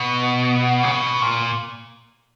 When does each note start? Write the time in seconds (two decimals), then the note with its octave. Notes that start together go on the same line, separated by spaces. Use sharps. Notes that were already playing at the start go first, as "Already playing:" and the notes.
Already playing: B2
0.83 C#3
0.92 B2
1.21 A#2